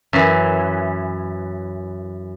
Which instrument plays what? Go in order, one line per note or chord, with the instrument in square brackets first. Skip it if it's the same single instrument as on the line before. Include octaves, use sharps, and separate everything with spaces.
[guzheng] F#2 E3